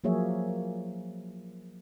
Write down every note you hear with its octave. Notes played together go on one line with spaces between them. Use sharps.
F3 F#3 A#3 G#4 C#5 E5